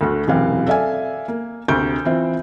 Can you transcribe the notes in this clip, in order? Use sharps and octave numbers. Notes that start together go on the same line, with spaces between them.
D2 A3 F#4
E1 F#2 C3 E3 C4 F5
A4 D5 E5 F5 G#5
A#3
D2 C3 A#5 C#6 G6 D7
E3 C4 F4 E5